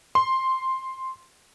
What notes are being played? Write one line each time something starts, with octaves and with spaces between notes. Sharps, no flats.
C6